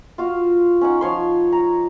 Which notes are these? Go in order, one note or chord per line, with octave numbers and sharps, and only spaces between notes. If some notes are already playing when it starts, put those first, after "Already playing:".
F4 F#4 F5
C#4 D#4 F#5
F3 C#5 C6
A#5